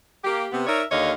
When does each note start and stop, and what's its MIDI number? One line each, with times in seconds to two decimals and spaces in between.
0.24 0.46 58
0.24 0.46 67
0.52 0.65 48
0.52 0.65 59
0.67 0.83 63
0.67 0.83 70
0.67 0.83 73
0.67 0.83 74
0.67 0.83 76
0.92 1.12 39
0.92 1.12 50
0.92 1.12 73
0.92 1.12 75
0.92 1.12 77